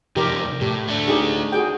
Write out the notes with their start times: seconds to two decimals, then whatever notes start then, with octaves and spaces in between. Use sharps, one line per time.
0.16 C3 F3 D#4 G4 A#4
0.61 A2 G4
0.88 A3 D4
1.08 D#4 G4 G#4
1.52 F#4 G#4 G5